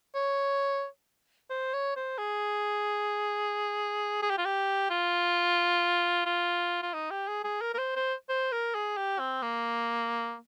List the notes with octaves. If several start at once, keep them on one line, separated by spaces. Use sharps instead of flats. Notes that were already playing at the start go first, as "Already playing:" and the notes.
C#5
C5
C#5
C5
G#4
G#4
G4
F4
G4
F4
F4
F4
D#4
G4
G#4
G#4
A#4
A#4
C5
C5
C5
A#4
G#4
G4
C4
A#3